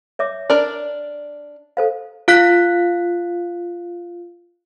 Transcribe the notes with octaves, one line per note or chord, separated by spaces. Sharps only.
C#5 E5 D6
D4 A#4 D5
A4 C5 F5
F4 F5 F#6 B6